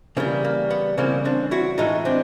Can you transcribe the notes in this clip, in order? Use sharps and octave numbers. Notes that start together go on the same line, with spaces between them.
C#3 E3 G3 A#3 C4
A#3
B3
C#3 E3 G3 A#3 C4
C4 D4
E4 F#4
A2 E3 G#3 D#4 F4
C4 D4